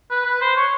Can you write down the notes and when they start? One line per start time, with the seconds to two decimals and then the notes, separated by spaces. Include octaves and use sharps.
0.11 B4
0.26 B4
0.41 C5
0.56 C#5